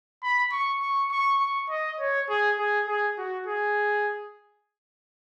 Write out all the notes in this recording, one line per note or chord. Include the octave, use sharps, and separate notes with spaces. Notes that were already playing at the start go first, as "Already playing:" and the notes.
B5
C#6
C#6
C#6
C#6
D#5
C#5
G#4
G#4
G#4
F#4
G#4